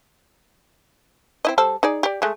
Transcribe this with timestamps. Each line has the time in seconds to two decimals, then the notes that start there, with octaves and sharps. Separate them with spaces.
1.45 C4 E4 D#5
1.58 G3 A4 C5
1.83 D#4 G#4 D5
2.03 G4 D5
2.22 G#3 A3